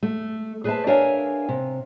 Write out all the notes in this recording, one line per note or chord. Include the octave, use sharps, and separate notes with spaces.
A3
G#4 B4 C5 D5 E5 A5
D4 A#4 C#5 E5 F5 G#5
C3